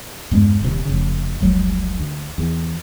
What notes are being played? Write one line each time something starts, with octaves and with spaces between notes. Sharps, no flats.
E2 G2 G#3
D#1 C3
F1 C#3
F1 C#2 F#3
D2
E2